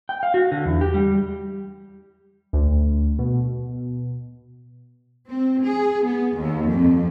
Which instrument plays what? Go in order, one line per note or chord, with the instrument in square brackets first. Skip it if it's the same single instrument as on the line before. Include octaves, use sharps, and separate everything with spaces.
[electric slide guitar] G5
F5
F#4
D3
E2
G4
G3
[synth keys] D2
B2
[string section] C4
G#4
B3
D#2
F2